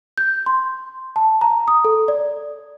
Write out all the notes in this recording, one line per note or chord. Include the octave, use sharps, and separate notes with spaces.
G6
C6
A5
A#5
D#6
A4
D5